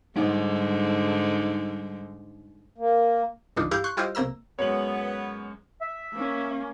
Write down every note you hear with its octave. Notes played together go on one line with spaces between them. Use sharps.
G#2 D3 G3 D#4
A#3
G1 C#2 E3 D4 D#4 F4
G2 E4 G4 F5 G6
C6 C#6 F#6
G3 E4 F4 G4 C5 D#5
B1 C3 A#3 A#5 E6
F#2 G#3 B3 C#5 F#7
E5
A#3 C#4